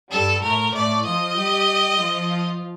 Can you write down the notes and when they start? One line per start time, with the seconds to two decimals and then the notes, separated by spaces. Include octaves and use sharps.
0.11 G2 G3 A4
0.43 A2 A3 A#4
0.74 A2 A3 D5
1.05 F3 F4 D#5
1.37 G3 G4
2.00 F3 F4